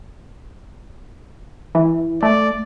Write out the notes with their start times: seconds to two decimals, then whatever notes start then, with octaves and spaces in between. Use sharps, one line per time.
1.75 E3
2.23 A3 D5